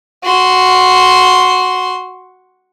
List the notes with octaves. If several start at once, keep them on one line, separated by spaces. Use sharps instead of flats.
F#4 C6